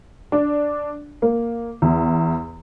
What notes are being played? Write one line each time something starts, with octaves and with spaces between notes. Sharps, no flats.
D4
A#3
E2